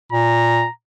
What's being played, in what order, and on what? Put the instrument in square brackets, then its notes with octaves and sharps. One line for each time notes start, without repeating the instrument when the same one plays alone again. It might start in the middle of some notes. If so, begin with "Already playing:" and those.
[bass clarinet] A#2 [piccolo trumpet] A#5